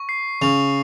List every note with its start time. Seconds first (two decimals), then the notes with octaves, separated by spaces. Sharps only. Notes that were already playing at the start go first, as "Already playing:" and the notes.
Already playing: C#6
0.09 C7
0.42 C#3 F7